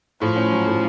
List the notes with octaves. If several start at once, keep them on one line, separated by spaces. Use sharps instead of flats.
A2 F3
C#4
F#3
A2